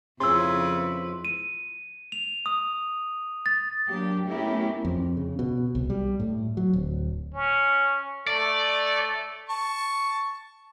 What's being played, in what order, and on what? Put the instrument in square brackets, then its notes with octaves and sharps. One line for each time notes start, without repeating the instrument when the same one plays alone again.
[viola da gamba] F2 E4 B4 [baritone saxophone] C#3 [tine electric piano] C6 E6
[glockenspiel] D#7
F7
D#6
A6
[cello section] F#3 A#3 D4 G4
A3 B3 C#4 E4 G4 A#4
[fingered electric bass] F2
C#3
B2
C2
G3
A2
F#3
D1
[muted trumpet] C#4
[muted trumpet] A3 [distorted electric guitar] D5
[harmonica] A5 C#6